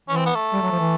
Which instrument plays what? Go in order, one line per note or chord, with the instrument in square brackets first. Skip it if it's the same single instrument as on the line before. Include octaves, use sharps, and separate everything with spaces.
[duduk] E3 [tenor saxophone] C#4
[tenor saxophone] C4
B3
A3
[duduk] G3
F#3
F3
E3